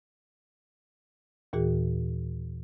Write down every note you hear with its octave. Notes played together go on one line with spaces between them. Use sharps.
D#2 A#2 E3 F#4 G#4